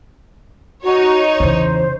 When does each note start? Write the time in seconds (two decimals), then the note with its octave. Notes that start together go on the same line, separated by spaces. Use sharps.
0.83 D#4 F#4 C#5
1.40 E2 C#3 C5